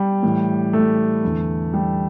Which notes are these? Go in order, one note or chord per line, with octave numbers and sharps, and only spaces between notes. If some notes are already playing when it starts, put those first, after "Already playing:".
Already playing: G3
A2 E3
A3
E2 D3
G3